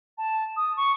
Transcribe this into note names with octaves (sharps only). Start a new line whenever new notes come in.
A5
D#6
C#6